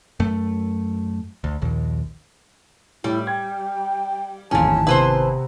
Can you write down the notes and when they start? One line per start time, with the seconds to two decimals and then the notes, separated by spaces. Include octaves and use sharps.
0.20 F#2 A3
1.44 D2
1.62 A#1 D#2
3.04 A2 G3 E4
3.27 G5 G#6
4.51 D1 G#1 E2 A#2 C#4 G#5 A5
4.87 C3 B3 C4 E4 B4 C5